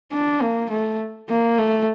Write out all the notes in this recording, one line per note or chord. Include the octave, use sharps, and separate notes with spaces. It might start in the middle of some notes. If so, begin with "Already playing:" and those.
D4
A#3
A3
A#3
A3